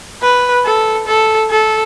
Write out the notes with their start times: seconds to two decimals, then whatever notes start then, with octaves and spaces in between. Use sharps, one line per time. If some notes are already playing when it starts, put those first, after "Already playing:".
0.22 B4
0.65 A4
1.07 A4
1.51 A4